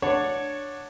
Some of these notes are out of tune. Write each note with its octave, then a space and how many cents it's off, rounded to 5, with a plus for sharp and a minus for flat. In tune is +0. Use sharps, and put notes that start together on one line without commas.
D4 +5 C#5 +0 F#5 -15